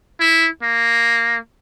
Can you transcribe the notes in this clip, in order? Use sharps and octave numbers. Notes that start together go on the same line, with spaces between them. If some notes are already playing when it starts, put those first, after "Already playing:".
E4
A#3